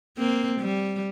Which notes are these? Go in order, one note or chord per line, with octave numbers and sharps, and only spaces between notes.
A#3 C4
G3